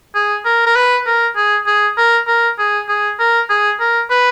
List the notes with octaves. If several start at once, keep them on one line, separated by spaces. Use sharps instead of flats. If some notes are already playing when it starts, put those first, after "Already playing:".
G#4
A#4
A#4
B4
A#4
G#4
G#4
A#4
A#4
G#4
G#4
A#4
G#4
A#4
B4